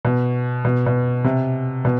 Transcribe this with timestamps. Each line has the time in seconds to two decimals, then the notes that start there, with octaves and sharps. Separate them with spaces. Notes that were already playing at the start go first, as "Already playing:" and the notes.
0.05 B2
0.65 B2
0.86 B2
1.24 C3
1.85 B2